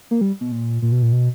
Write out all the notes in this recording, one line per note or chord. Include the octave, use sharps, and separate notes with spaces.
A#3
G3
B2
A#2
A#2
B2
A#2
B2